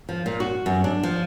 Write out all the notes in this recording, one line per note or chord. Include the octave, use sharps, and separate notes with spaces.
F3
A#2
F#4
F#2
D4
F3